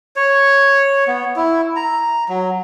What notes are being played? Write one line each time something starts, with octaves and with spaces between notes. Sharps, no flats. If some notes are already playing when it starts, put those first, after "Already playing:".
C#5
B3
E4
A#5
F#3